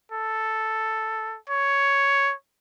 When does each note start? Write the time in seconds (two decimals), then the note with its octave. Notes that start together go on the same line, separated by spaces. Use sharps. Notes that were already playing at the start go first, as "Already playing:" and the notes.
0.12 A4
1.50 C#5